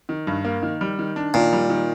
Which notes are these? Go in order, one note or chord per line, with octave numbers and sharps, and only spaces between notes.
D#3
G2
A#3
D#3
G3
D#3
D4
A#2 D#3
G3
D#3